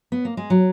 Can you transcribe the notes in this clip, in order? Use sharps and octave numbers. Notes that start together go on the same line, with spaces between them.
B3
A#3
G#3
F#3